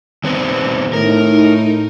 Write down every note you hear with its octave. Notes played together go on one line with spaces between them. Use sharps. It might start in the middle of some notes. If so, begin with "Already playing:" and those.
D#3 B3 C4
A2 D#4 A#4